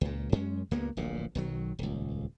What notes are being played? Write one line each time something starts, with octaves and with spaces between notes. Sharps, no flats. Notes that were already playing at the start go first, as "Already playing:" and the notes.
C#2 A#2
F#2 G#3 C#4
C#2 G2 A#3 B3
D1 A#1 A#2
B1 D#3 F#3
D#1 C#2